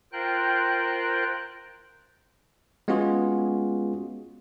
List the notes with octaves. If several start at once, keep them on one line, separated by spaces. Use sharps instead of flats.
F4 A#4 C5 G5 F#6
G#3 B3 C#4 F4 F#4 G#4